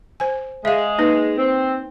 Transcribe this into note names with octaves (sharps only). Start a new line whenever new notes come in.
C5 G#5
G#3 E5 F5
A#3 D#4 B4
C4